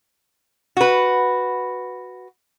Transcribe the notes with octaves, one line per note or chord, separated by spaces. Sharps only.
F#4 B4